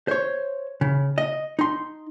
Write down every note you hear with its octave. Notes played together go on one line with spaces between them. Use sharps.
C5 C#5
C#3
D#5
D#4 C6